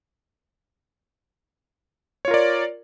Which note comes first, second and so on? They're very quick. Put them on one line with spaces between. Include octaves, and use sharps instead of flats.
C#5 F4 A#4 D5